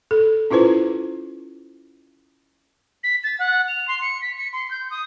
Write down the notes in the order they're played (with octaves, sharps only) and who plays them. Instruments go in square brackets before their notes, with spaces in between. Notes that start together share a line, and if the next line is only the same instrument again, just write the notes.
[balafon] A4
C#4 E4 F4 B4 C5
[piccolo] B6
A6
F#5
F7
C6
C#7
B6
C#7
C6
G6
D#6